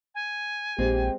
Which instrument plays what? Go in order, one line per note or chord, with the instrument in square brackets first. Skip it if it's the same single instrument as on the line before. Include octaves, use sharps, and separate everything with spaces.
[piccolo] G#5
[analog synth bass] A#1 [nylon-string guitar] G#3 C4 [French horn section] G4